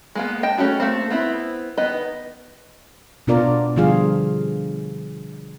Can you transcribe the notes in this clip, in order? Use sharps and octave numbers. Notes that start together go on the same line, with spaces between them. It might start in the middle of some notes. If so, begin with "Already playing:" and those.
G#3 A#3 B3
D#5 G5 A5
A3 C#4 E4 F#4 G#4
A3 A#3 C4
B3 C4 E4
D#3 B3 B4 D#5
B2 B3 D4 F4 A#4 D5
D3 F3 G3 F4 G#4 F5